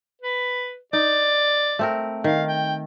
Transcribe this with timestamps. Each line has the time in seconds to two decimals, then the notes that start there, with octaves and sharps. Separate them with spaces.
0.22 B4
0.93 D#4 D5
1.79 A3 C4 A#4
2.24 D#3 F5
2.48 G5